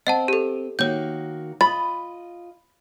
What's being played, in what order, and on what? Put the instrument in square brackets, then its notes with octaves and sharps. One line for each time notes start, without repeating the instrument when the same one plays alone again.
[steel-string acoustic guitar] C4 [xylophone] D#5 F#5 A5
[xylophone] G4 A4
[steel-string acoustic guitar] D#3 A#3 F#4 [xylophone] C#5 G6
[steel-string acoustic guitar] F4 D#5 [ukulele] B5 [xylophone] A6